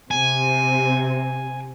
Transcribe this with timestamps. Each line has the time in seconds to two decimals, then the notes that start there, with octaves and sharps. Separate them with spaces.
0.11 C3 G#5